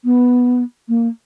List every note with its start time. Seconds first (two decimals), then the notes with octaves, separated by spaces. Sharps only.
0.05 B3
0.89 A#3